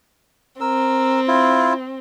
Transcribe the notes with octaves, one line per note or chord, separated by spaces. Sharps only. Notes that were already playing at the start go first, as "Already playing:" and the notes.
C4 A#4 E6
E4 F4